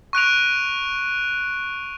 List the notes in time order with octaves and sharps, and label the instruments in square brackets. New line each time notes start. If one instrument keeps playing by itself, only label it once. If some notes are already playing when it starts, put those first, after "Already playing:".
[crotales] C#6 F#6 D7 F7